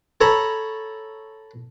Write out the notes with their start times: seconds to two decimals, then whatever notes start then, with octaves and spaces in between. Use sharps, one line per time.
0.21 A4 C#5 A#5 B5